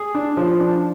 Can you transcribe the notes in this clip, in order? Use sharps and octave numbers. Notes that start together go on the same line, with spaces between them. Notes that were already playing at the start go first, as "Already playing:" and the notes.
Already playing: G#4
D4
F3
D4